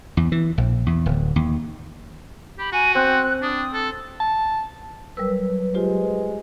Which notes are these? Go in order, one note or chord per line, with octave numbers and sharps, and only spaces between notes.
E2
E3
A#1
E2
D1
D#2
G4 B5
F#4 G#5
C4 F#6
D4 D#6
A4
A5
F#3 G3 A#4 B4 E6
G#3 F4 G4 C5